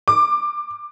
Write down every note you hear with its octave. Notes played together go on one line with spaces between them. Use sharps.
D6